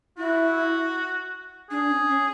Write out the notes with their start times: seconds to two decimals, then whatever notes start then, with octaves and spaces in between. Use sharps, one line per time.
0.18 E4 F#4
1.70 D4 G#4
1.89 C#4
2.09 C#4